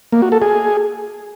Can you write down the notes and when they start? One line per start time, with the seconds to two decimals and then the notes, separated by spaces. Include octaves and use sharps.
0.12 A#3
0.22 F#4
0.32 A4
0.42 G#4